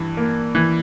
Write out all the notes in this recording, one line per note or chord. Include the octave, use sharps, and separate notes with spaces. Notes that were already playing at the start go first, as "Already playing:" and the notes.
Already playing: G2 E3
A#3
E3